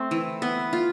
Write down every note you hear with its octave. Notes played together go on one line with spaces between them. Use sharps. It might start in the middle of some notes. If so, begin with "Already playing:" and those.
Already playing: A3 C4
E3
B3
F4